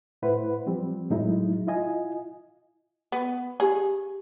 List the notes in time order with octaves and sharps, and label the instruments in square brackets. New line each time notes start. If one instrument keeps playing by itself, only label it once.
[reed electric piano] A2 E4 B4 C5 F#5
F3 G3 C4
A2 F#3 G#3 D#4 E4
E4 F4 D#5 G#5
[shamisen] B3
[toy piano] G4 [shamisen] G#4